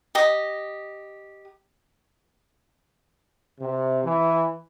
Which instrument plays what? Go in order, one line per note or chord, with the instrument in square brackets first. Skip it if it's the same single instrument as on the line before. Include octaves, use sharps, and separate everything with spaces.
[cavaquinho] G4 D#5 D#6
[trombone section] C3
E3